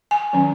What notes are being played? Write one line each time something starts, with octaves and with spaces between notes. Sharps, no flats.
G#5
D#3 F#3 C#4